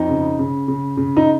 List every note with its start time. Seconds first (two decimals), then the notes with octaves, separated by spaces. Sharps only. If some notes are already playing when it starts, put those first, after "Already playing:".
Already playing: F2 D#4
0.09 C#3
0.39 C#3
0.68 C#3
0.97 C#3
1.17 D#4